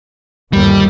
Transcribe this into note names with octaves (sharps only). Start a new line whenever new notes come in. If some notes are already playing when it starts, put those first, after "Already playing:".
G1 D#2 G3